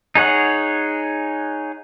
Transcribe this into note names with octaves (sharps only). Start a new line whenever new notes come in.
D#4 G#4 C#5 F#5